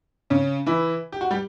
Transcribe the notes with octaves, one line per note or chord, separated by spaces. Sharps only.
C#3 C#4
E3 E4
G4
F#4
G3 G4